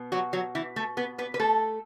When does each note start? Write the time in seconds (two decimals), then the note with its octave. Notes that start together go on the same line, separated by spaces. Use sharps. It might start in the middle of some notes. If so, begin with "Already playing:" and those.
Already playing: B2 B3
0.12 F#3 F#4
0.33 F#3 F#4
0.55 E3 E4
0.76 A3 A4
0.97 B3 B4
1.18 B3 B4
1.34 B4
1.39 A3 A4